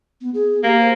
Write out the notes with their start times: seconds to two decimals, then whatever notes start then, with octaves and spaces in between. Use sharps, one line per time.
0.21 B3
0.34 G#4
0.63 A#3 G4
0.80 C5